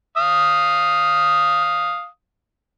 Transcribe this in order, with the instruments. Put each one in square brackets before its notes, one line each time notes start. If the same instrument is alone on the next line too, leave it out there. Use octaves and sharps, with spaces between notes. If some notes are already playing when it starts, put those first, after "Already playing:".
[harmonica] F5 D#6